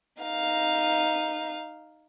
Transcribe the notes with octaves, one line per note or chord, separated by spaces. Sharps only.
D#4 F5